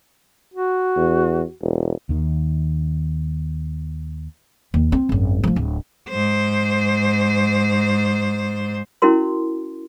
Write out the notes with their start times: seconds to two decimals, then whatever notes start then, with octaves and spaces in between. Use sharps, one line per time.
0.54 F#4
0.96 E2
1.62 E1
2.09 D#2 D#3
4.74 D#2
4.92 C4
5.09 G#1 F#2
5.44 F3 A3
5.56 D1
6.10 G#2 C5
9.02 C#4 E4 F#4 A#4 C6